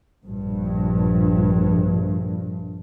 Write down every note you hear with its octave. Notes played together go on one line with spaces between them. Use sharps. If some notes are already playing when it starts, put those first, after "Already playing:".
A#1 G2